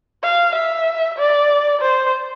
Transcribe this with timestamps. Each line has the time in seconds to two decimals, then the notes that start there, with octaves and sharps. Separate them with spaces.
0.24 F5
0.55 E5
1.18 D5
1.81 C5